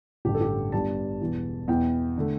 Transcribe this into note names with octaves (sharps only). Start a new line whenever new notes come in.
A1 G2 D3 G4
A4
G4
G1 G2 G3 D4 A5
E1 E2 E3
E2 B2 B3 E4 G5
D3 A3